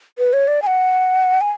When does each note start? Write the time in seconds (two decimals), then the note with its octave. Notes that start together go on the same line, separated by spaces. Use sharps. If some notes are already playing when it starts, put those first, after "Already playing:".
0.18 B4
0.33 C#5
0.48 D5
0.62 G#5
0.67 F#5
1.41 G#5